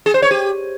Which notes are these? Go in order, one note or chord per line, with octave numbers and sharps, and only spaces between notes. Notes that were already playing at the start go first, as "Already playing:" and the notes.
G#4
C5
C#5
G4